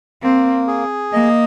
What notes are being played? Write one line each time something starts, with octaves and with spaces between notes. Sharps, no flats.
A#3 C4
G#4
A#3 D#5